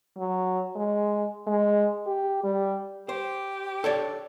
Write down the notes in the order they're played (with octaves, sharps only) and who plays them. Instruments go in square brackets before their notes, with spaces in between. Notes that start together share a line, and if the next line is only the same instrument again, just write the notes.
[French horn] F#3
G#3
G#3
G4
G3
[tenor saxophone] G4 [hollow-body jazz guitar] C5
[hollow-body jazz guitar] A4 C#5 D5